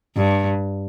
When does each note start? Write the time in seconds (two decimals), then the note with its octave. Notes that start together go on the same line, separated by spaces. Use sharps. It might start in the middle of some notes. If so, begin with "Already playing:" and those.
0.17 G2